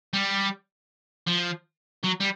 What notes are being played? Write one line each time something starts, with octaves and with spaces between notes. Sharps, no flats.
G3
F3
F#3
G3